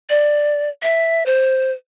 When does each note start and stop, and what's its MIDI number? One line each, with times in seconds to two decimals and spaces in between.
0.10 0.69 74
0.82 1.26 76
1.26 1.72 72